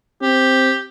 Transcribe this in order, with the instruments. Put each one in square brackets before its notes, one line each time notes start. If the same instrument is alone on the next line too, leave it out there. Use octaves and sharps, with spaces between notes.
[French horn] C4 [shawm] G4